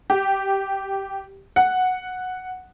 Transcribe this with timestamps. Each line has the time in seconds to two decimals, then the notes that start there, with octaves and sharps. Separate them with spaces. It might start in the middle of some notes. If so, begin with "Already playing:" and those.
0.10 G4
1.56 F#5